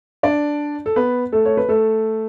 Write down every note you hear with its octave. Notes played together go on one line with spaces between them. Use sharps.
D4 D5
A4
B3 B4
A3 A4
C#5
B4
A3 A4